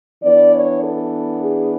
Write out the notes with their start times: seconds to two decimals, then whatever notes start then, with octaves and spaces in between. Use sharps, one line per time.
0.23 E3 B3 D4 D5
0.53 C#5
0.82 A4
1.42 G#4